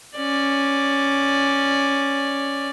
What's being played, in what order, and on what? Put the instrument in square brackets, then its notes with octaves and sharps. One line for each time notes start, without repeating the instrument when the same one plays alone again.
[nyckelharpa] C#4 D5